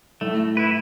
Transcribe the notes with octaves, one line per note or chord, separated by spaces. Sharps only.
A2 A3
E4 B4